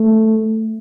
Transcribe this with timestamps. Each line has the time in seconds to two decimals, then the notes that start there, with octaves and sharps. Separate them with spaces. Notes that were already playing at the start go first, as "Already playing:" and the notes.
Already playing: A3